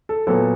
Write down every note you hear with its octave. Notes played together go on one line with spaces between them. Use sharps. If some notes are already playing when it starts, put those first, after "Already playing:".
A4
A#2 F#3 B3 A4